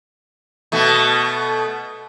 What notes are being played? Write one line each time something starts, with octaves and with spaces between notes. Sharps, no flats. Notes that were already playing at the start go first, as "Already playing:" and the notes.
B2 A3 B3